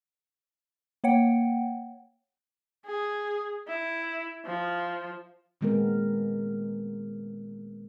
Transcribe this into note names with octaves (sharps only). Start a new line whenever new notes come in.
A#3 C#5 F#5 G5
G#4
E4
F3
A#2 D#3 G#3 B3 C4 A#4